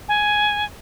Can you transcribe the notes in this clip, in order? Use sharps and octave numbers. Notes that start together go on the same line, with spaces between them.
G#5